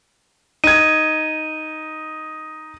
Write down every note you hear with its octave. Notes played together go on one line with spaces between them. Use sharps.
D#4 G#6 D#7